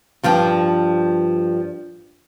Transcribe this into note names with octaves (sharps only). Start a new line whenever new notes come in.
G2 F3 D4 G5